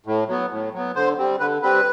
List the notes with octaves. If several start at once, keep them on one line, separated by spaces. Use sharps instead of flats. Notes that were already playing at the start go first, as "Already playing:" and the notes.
A2
F#3 B3
A2
F#3 B3
D3 C5
G3 C4
D3 B4
G3 C4 B4